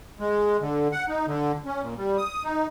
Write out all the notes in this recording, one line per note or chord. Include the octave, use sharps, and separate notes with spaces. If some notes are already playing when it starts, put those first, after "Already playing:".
G#3
D3
F#5
D#4
D3
C#4
A#2
G3
D#6
D#4